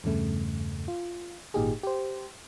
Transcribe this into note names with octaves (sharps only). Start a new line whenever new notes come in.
E2 G2 C#3 A3
F4
G#1 A#2 D#4 G4 G#4
G4 C5